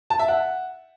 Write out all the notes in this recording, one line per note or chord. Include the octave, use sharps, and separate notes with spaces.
A5
E5
F#5